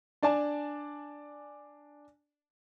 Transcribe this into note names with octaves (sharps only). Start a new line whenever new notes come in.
D4 D5 G#5 A5